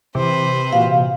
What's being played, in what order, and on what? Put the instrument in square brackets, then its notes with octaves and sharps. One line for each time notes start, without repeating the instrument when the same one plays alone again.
[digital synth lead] C3 [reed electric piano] E3 D6 [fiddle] B4 C5
[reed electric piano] A#2 E3 F#4 [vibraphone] F5